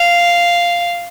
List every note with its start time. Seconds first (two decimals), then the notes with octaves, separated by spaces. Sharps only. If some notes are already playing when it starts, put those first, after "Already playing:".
Already playing: F5